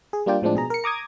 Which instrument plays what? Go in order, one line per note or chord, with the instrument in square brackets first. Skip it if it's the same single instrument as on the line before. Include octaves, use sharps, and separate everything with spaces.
[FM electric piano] G#4
G3 A#3 D4 F4 D5 G5
A2 F3 G#3 C4 D4
B2 G#4 A#5
A#4 C#7
A#5 D6 D#6 G#6